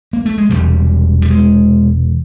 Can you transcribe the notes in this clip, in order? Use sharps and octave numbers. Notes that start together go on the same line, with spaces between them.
A#3
A3
G#3
E1 E2 C3 G3
G3
G#3